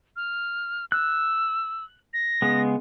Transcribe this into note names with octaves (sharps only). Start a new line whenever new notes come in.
F6
E6 F#6
A#6
C#3 G#3 B3